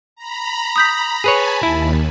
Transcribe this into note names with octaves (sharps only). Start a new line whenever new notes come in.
A#5 B5
D#6 G6 B6
G#4 B4 C#5 G#5 A5 B5
D#2 E4